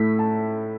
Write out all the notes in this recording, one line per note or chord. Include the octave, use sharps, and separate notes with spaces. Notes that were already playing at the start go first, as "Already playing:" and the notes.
Already playing: A2 A3 E4 B6
A5